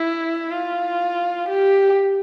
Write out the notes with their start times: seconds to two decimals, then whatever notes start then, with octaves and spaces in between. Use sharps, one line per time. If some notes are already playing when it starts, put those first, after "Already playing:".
Already playing: E4
0.51 F4
1.49 G4